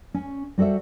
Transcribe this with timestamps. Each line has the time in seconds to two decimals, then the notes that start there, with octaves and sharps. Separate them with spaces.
0.14 C#4
0.58 G3 F#4 A4 C5 E5